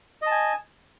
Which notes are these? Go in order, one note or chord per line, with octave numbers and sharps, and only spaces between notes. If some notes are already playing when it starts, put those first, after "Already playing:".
D#5 G#5 A5